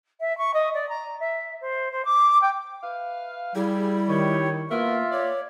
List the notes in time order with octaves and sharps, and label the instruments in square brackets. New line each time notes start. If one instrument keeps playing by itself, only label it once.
[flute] E5
C#6
D#5
D5
A#5
E5
C5
C5
D6
G5
[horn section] B4 E5 F5
[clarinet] G3 [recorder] E4 [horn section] G4 G#4
[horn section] D#3 [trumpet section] G4 C#5
[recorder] A#3 [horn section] B3 A#4 [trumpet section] F4 [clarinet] E5
[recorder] C#5 [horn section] D5